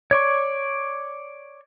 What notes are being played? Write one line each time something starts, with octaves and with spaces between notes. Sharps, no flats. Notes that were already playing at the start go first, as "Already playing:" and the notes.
C#5 D5 C#6